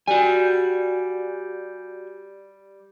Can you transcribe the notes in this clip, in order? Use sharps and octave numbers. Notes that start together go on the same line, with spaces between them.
G3 F#4 G#5